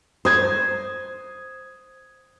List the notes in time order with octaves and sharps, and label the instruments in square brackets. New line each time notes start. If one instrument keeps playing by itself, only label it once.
[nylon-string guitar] C5 [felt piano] D#6 G#6